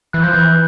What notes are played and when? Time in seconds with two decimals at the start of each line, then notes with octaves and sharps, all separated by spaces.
0.13 E3 F#6
0.22 F3 G6
0.30 E3 F#6